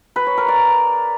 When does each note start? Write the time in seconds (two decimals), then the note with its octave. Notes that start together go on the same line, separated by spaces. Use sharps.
0.16 B4
0.27 C#5
0.37 A#4
0.48 D5